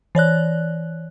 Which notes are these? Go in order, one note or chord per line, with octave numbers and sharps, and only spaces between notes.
E3 C#5 D5 F#6